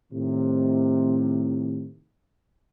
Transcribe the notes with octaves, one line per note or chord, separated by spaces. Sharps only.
A2 C3 D#3